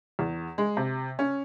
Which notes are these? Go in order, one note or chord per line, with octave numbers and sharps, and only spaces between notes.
E2
G#3
C3
C#4